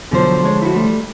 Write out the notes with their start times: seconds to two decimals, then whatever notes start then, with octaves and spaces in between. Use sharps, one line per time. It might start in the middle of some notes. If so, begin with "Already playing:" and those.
0.11 B2 D3 F3 F#3 C5
0.44 G#3 C#5
0.62 E4 F#4
0.75 G3 A3